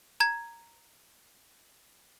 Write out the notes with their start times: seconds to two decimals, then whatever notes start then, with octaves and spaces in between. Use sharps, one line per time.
0.20 A#5 G#6